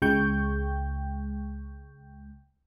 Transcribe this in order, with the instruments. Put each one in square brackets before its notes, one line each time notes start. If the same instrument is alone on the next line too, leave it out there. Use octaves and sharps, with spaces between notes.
[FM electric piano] C#2 G#3 G5 C#6 G6